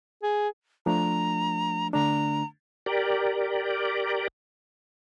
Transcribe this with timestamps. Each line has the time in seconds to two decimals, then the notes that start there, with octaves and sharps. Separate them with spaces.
0.23 G#4
0.86 F3 A3 D4 A#5
1.93 D3 A3 D4 A#5
2.86 G4 A#4 D5